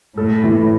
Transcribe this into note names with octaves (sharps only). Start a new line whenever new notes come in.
A2 A4
E3